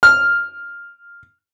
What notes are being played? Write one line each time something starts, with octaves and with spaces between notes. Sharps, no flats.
F6